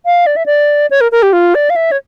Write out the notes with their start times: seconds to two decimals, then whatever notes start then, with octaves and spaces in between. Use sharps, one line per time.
0.05 F5
0.26 D5
0.36 E5
0.46 D5
0.91 C#5
1.01 A#4
1.12 A#4
1.22 G4
1.33 F4
1.55 D5
1.70 F5
1.76 E5
1.92 C#5